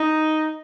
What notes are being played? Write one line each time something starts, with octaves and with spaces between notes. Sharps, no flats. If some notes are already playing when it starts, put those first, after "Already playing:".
Already playing: D#4